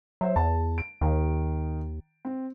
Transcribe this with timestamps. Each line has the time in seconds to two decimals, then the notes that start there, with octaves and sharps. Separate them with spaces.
0.21 F#3 C5 E5
0.36 E2 A5
0.78 D7
1.01 D#2 D#3
2.25 C4